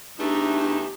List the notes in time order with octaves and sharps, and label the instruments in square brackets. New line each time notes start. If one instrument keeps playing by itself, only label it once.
[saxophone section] E2 A3 [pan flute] D4 [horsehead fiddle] D#4 [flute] G4